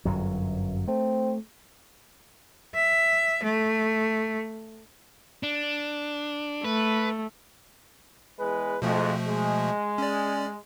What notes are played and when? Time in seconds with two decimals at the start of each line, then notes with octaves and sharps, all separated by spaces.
0.05 G1 F#2 F#3
0.88 A3 C4
2.75 E5
3.43 A3
5.43 D4
6.64 A3 B4
8.39 E2 G#3 B4
8.82 F2 B2 F3 G#3 A3
9.27 G#3
9.98 C#4 D5